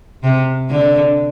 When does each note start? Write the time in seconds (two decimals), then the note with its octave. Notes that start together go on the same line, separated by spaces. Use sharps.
0.23 C3
0.70 D3